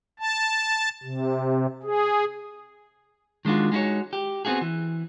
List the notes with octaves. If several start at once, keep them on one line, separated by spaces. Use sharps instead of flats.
A5
C3
G#4
D#3 G#3 D4 F4 F#4
G#3 D#4 E4 F#4 C#5
G4
B3 C4 D#4 F#4 G#4
E3